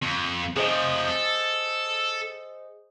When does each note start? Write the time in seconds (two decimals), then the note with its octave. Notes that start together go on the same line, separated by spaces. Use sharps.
0.02 F2
0.56 C3 F3 G#4 C5 D#5
1.08 A4